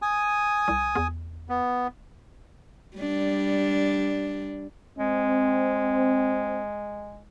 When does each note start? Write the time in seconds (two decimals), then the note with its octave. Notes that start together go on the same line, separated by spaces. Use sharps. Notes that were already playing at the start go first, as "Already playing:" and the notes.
0.02 G#5 D#6
0.68 C2
0.95 E2
1.49 B3
2.97 G3 D4
4.98 G#3 C4